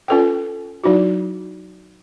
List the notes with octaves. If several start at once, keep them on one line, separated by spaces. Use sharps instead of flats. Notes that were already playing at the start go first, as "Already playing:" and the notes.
C#4 F4 A4 B4 G5
F#3 D#4 E4 F#4